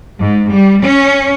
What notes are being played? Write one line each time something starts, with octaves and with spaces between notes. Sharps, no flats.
G#2
G3
C#4